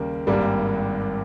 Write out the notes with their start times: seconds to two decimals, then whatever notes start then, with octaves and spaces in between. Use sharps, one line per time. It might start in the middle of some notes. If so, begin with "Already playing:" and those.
Already playing: D#2 C#3 G3 A#3
0.27 G#1 G2 G3 A#3